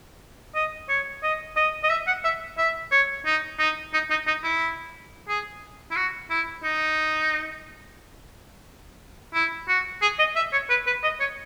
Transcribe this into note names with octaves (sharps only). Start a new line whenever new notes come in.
D#5
C#5
D#5
D#5
D#5
E5
F#5
E5
E5
C#5
D#4
D#4
D#4
D#4
D#4
E4
G#4
E4
F#4
E4
D#4
E4
F#4
G#4
D#5
E5
C#5
B4
B4
D#5
C#5